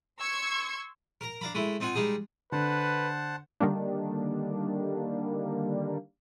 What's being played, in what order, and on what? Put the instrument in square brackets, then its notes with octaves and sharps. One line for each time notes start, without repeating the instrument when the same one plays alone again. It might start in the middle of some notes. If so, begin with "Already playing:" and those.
[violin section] C6 C#6 E6 G#6 C#7
[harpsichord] A#4 A#5
D4 F5 A#5 B5
G#3 A3 E4
C4 D#4 F4 F#5 G#5
G3 G#3 D#4 G#4
[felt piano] D3 [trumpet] B4 [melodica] C5 F#5 A5
[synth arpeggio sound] D3 D#3 G3 A#3 D4